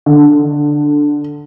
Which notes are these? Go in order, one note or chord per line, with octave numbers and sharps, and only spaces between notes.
D3